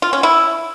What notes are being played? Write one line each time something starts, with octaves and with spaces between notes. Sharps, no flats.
F4
C#4
E4